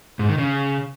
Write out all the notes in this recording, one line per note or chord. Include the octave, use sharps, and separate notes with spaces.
G#2
D#3
C#3